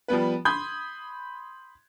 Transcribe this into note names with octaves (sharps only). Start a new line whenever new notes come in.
F3 G3 B3 B4
B5 C6 D#6 G6 G#6